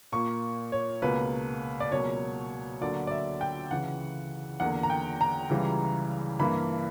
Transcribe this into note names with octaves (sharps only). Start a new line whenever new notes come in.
A#2 A#3 C#6
C#5
C#2 B2 A#3 B4
D5
C#2 B2 F#3 A#3 C#5
D2 D3 F#3 A#3 D5
D5
E5
G5
C#2 C#3 E3 F#5
E2 D3 A#3 F#5
A#5
G5
A#5
C#2 C#3 E3 G3
G2 E3 A#3 B5